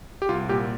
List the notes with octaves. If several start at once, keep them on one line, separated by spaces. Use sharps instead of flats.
G4
C2 F4
A#2 G4